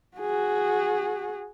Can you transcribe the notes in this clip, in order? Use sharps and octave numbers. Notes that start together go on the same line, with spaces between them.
F#4 G#4